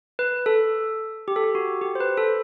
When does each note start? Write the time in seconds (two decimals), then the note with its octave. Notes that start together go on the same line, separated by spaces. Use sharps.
0.19 B4
0.46 A4
1.28 G4
1.36 A4
1.44 G4
1.55 F#4
1.81 G4
1.95 C5
2.00 B4
2.17 A4